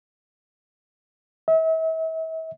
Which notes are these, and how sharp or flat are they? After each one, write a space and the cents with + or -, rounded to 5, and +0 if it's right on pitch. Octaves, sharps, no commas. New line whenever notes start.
E5 -40